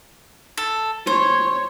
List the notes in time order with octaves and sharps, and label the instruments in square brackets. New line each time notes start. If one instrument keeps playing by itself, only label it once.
[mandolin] A4
[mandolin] C5 [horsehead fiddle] C#5